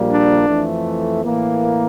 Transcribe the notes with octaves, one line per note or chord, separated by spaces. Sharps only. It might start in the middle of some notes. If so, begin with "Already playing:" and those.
Already playing: A#1 A#2 G3 A#3
D4
F2 E3 A3
A2 E3 A#3